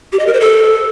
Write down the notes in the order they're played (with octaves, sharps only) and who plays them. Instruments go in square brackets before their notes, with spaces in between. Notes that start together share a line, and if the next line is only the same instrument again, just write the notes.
[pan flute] G4
D#5
A#4
C5
A4